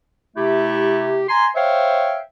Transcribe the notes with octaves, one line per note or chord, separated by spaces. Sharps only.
C3 A3 E4 G4
G#5 A#5 C6
C5 C#5 E5 F5 G5